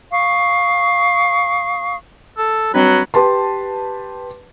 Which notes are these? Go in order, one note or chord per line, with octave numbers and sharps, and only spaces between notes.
F5 C#6 D#6
A4
F#3 G3 C4 D4 B4
G4 B4 A5 C6